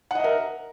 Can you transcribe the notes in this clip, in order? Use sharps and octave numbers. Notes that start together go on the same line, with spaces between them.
A#4 D#5 E5 F#5